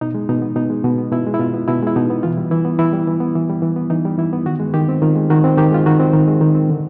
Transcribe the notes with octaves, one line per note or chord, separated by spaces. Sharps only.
B2 D#4
G#3
B2 D#4
B3
B2 D#4
G#3
B2
B3
B2 E4
G#3
E4
B2 F4
B3
B2 E4
G#3 E4
B2 D#4
B3
E3 F4
G3
E3 E4
B3
E3 E4
G3
E3
B3
E3
G3
E3
B3
E3 D#4
G3
E3 E4
B3
D#3 F#4
G#3
D#3 G4
C4
D#3 F4
G#3
D#3 F#4
C4
D#3 G4
G#3 F4
D#3 F#4
C4
D#3
G#3
D#3
C4
D3